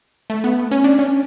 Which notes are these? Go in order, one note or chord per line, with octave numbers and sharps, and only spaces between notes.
A3
B3
C#4
D4
C#4